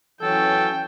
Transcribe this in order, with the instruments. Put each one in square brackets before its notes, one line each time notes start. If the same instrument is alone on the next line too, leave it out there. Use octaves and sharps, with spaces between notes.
[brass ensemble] E3 F#3 C#4 [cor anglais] A4 [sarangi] G5